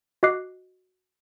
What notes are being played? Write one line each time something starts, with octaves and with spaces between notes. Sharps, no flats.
F#4 D#5 D6 F#6 C7